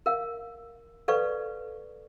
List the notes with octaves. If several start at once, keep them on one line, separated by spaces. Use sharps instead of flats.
A#4 F5
A4 B4 D5 F5 C#6